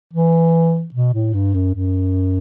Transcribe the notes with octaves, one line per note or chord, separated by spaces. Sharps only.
E3
B2
A2
G2
F#2
F#2